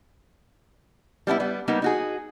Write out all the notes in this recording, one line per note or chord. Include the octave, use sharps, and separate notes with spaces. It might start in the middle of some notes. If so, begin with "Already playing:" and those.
G3 B3 D4 E4
G3 B3
G3 A#3 B3 D#4
D#4 F#4 G#4